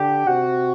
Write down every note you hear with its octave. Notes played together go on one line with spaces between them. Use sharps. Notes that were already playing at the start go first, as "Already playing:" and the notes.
Already playing: D3 G4
C3 F#4